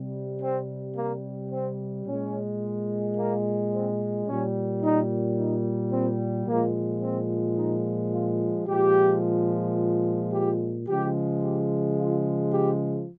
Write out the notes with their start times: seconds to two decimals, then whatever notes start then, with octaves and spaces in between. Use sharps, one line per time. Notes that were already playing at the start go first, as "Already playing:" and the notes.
Already playing: C3 G3
0.41 C4
0.96 A#3
1.51 C4
2.06 A#2 G#3 C#4
3.16 A#3
3.72 C4
4.27 A#2 G3 C#4
4.82 D#4
5.37 D#4
5.92 C4
6.47 A#2 F3 G#3 A#3
7.02 C4
7.57 D#4
8.12 F4
8.68 A#2 F3 G#3 G4
10.32 G4
10.87 C#3 F3 G#3 G4
11.43 G4
11.98 F4
12.53 G4